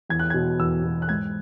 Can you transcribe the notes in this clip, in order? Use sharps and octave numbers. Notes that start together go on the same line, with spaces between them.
E2 G#6
F#6
B2 G#6
E2 E6
B2
F#6
G#2 G#6